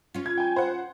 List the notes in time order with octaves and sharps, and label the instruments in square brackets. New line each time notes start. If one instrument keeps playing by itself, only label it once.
[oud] C#4 F4
[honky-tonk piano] G#6
G5 G#5
C5 F#5